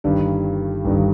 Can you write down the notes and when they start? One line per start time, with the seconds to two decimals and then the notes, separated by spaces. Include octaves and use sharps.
0.04 G1 G2 D#3 G3
0.85 G1 G2 D#3 G3